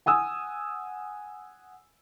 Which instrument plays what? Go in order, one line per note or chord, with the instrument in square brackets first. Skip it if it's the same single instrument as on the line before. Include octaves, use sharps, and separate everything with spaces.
[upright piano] F#5 G#5 D#6 E6